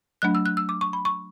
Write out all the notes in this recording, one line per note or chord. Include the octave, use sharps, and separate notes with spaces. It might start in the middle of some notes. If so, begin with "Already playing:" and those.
F#3 A3 D4 F#6
E6
F#6
E6
D6
C#6
B5
C#6